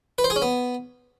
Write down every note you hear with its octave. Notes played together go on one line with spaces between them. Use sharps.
B4
C5
G#4
C#4
B3